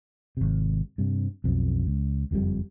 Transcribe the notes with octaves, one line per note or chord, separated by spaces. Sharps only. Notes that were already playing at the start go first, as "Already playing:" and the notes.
G#1 C3
G2 C3
B1 F2
C#2
F#1 F2 C#3 G3